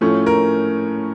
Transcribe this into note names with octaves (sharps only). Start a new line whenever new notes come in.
A2 F3 A3 C#4
A#4